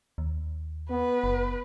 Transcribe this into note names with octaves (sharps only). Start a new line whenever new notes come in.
D#2
B3 B4
F#1